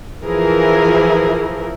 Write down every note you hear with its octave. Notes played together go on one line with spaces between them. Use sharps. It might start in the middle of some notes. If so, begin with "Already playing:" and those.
E3 F3 E4 G#4 A#4